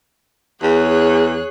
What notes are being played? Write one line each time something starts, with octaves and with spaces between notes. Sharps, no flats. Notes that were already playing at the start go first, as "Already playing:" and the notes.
E2 G#4 C#5 F#6